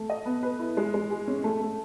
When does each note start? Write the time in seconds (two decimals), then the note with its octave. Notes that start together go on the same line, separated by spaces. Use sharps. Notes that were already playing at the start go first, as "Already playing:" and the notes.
Already playing: A3
0.10 D#5
0.26 B3
0.43 B4
0.59 E4
0.77 G#3
0.94 G#3
1.10 G#4
1.28 C#4
1.44 A3
1.61 A3